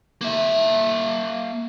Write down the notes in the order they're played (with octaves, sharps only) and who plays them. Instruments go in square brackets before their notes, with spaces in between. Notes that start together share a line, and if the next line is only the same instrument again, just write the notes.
[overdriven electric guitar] A#3 E5